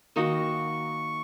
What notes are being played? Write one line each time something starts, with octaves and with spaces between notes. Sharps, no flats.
D#3 A#3 D#4 F#4 C#6